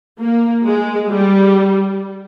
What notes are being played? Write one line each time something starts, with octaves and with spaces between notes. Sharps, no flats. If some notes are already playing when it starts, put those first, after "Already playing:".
A#3
G#3
G3